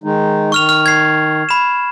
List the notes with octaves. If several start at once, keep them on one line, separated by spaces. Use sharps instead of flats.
D#3 G#3 D#4
D#3 C#6 F6 F7
F6
G#6 C7
B5 E7